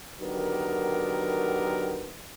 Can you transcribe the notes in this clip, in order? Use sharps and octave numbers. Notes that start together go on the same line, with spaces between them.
D3 D#3 F#3 B3 G4 A#4